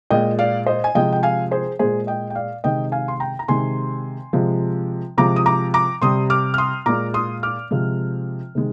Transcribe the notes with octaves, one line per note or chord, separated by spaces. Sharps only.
A#2 G#3 D#5 G5
D5 F5
C5 D#5
G#5
C3 F3 G#3 D#5 G5
G5
F5 G#5
G#4 C5
A#2 G#3 G#4 C5
D#5 G5
G5
D5 F5
C3 D#3 G#3 D#5 G5
F5 G#5
C6
G5 A#5
A#5
C3 D#3 G#3 G#5 C6
C3 F3 G#3
C3 F3 G#3 A#5 D6
D#6
A#5 D6
A#5 D6
C3 G3 C6 D#6
D6 F6
F6
C6 D#6
A#2 G#3 A#5 D6
C6 D#6
D6 F6
C3 F3 G#3
C3 D#3 G#3